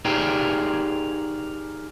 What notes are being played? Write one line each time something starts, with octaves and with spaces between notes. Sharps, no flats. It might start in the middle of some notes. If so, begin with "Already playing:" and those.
D#4 G4 G#4 A#4 D5 G5